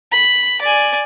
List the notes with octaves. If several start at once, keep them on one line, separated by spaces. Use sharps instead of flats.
B5
D5 G#5